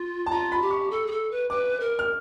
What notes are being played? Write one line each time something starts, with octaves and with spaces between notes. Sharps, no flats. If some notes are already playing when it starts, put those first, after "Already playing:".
Already playing: F4
A5
F4 A#5
B5
G4
C#6
A4
G#4
A4
B4
B4 D6
A#4
F6